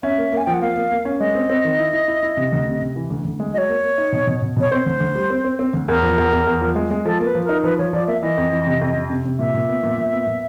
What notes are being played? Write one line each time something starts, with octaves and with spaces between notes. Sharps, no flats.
C#4 E5
A#3
A#3 G#5
F3 G5
F#5
A#3 F5
A#3
A#3
C#4
G#3 D#5
C4
C4
D#3
E4
E4
E4
E4
C3
D2
C3
C3
E3
D2
D2
G#3
F#3 C#5 D#5
A#3
A#3
D#4
B2
B2
B2
B2 C#5
C4 C5
D2
D2
G3
C4
C4
C4
D2
E2 A#4
F3
E2
E2
E2
F3
G#3
G#3
F3 A4
A#3 B4
F3
D#4 A#4
F3 B4
F3 C#5
F3 D5
A#3 E5
E3 D#5
F2
E3
C3
F2
C3
C3
C3
A#2 E5
A#2
B3
A#2
A#2
B3
A#2